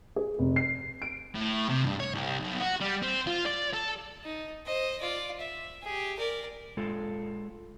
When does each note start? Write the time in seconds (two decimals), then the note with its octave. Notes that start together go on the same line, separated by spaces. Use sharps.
0.16 G#4
0.39 F1
0.56 C7
1.02 D7
1.35 A2
1.69 C3
1.83 G2
2.00 C#5
2.14 C2
2.41 B1
2.60 F#4
2.80 G3
3.02 C4
3.27 F4
3.46 D5
3.74 A4
4.24 D#4
4.66 C5 D#5
5.00 F4 D5
5.40 E5
5.82 G4 G#4
6.19 A#4 D5
6.77 G#3 F4 A4